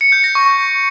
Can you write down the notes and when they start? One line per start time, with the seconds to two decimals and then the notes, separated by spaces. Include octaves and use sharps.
0.01 C#7
0.12 G6
0.24 A#6
0.35 C#6